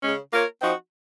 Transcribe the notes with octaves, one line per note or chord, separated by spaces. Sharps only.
C#3 G#3 C#4
A#3 F4 A#4 C#5
F3 C4 D#4 F#4